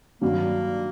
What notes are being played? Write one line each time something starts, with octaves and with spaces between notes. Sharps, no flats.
G2 D#3 F#3 A#3